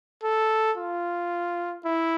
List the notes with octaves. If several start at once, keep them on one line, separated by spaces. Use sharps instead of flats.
A4
F4
E4